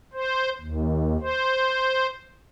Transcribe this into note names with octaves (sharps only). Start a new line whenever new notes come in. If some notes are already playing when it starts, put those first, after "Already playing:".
C5
D#2
C5